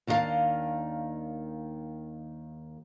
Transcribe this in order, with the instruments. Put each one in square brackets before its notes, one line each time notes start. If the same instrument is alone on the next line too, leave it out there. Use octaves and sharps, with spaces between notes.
[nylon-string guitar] D#2 D#3 D4 F4 F5 A5